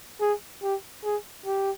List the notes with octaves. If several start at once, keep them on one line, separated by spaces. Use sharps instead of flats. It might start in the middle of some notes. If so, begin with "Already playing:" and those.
G#4
G4
G#4
G4